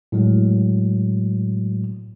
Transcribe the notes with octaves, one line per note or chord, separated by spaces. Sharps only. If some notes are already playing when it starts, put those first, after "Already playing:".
A2 F#3 G#3